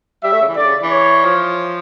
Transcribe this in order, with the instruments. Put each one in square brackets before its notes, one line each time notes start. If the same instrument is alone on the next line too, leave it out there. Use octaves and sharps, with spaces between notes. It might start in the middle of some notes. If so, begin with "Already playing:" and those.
[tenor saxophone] G3 [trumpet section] E5
[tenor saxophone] A3
C#3
E3
[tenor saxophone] D3 [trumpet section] D5
[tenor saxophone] C#3
E3
[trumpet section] C#5
[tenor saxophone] F3